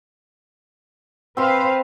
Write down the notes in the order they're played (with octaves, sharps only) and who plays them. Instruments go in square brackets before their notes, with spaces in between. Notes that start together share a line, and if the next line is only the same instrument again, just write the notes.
[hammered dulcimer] C4 C6 [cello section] B4 C5 F5